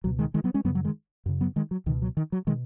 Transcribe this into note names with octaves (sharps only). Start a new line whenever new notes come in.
C#2 B2 F#3
D#3 G#3
D#3 G#3
F#3 B3
G#3 C#4
F#2 C#3 F#3 B3
F#3
D#3 G#3
F#2 C#3
F#3 B3
D#3 G#3
F#3
C#2 B2 D#3
F#3
D#3
F#3
B2 D#3 G#3